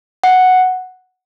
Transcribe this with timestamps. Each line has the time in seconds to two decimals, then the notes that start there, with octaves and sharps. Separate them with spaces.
0.24 F#5